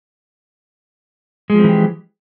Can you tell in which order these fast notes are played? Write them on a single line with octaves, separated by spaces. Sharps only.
G#3 F3 C4 E3 G4